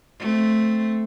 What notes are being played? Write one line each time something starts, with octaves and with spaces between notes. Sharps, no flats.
A3 C4